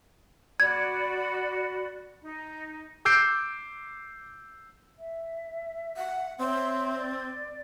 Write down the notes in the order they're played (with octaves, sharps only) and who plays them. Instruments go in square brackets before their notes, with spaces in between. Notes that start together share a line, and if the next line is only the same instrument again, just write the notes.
[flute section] F#4 D5 B5 [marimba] G#6
[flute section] D#4
[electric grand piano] D6 E6 G6 C7 D7
[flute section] E5
[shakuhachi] F#5
[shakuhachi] C4 [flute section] C#5 E5 C6
[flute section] D5